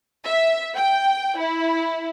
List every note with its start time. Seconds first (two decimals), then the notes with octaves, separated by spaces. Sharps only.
0.24 E5
0.76 G5
1.38 E4